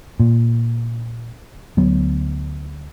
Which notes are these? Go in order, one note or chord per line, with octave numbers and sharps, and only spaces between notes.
A#2
D2 F#3 B3